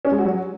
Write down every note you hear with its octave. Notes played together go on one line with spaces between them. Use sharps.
C#4
G#3
F#4
F#3